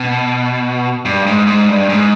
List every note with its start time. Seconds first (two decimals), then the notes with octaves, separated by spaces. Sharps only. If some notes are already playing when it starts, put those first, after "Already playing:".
Already playing: B2
1.05 G2
1.26 G#2
1.47 G#2
1.68 G2
1.89 G#2